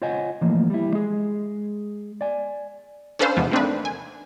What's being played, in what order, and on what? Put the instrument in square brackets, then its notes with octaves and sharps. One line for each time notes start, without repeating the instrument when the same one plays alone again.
[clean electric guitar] F4 C5 C#5 D#5 F#5 G#5
E3 F3 A3 A#3
G3 E4
G#3 G#4
D5 G#5
[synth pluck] C#4 D4 A4 B4 C5 F5
E2 G#2 C3 F3 B3
A3 A#3 C4 D4 D#4 B4
G#5